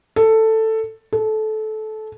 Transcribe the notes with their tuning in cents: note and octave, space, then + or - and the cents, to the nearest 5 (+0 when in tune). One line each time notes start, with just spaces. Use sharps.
A4 +10
A4 -20